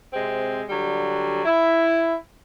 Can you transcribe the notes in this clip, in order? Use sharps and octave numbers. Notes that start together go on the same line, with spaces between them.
C3 G#3 C4
D3 F#3 G3
E4